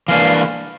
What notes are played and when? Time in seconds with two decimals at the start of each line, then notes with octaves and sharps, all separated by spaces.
0.08 E3 A#3 D4 F5